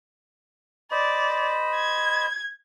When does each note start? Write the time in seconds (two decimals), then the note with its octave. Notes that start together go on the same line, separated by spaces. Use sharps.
0.91 C5 D5 D#5 B5
1.75 G#6